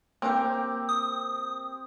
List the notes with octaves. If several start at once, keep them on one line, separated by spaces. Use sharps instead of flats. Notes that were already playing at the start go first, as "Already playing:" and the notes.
A#3 C4 G4 G5 D6
D#6